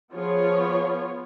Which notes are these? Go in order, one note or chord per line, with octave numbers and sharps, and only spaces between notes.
F3 B3 F4 G#4 C#5